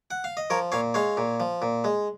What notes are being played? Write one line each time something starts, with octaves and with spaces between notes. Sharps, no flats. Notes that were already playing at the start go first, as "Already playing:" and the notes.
F#5
F5
D#5
F3 A#4 C#5
A#2 C#5 F5
G#3 C#5 F5
A#2
F3
A#2
G#3